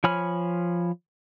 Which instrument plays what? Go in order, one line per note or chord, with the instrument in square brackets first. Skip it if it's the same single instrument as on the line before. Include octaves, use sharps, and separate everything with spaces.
[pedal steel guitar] F3 C#5 G#5 B5 F6